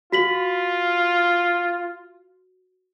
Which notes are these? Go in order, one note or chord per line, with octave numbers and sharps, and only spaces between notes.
F4 F#4 B6 F#7